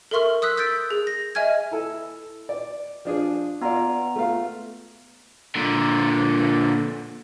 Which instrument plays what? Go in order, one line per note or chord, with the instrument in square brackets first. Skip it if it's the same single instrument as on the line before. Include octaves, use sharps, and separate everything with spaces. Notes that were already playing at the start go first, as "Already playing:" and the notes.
[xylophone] A4 A#4 E5 C6 C#6 F6
D#6 E6 F#6 B6
E6 G6 A6 B6 D7
G#4
A#6
D#5 E5 G#5 F6 G#6
[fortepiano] E4 A4
D5
F3 D4 G#4
[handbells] B3 A#5 [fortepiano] F4 D5
[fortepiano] A3 F4 F5
[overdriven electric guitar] A#2 D3